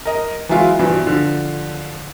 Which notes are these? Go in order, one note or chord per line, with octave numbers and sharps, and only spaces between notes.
A#4 D#5
E3 F#3 G#3 E4 F4
G2 B2 E3 F3
D3 F3